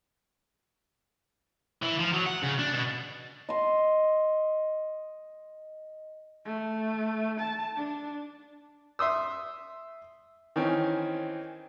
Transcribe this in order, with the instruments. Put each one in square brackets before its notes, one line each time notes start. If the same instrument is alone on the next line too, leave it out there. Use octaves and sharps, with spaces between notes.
[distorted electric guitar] E3
F3
F#3
F#5
C#3
D4
B2
[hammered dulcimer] D#5 C6
[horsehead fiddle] A3
A5
D4
[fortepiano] E5 C6 D#6 E6
D#3 E3 C4 C#4